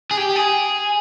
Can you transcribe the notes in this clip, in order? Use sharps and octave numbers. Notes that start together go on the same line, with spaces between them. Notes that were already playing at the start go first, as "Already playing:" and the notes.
G#4
G4
G#4